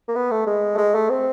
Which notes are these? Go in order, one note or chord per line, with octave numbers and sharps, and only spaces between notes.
A#3
B3
A3
G#3
A3
G#3
A3
C4